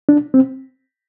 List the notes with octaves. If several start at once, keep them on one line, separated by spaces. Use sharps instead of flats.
D4
C4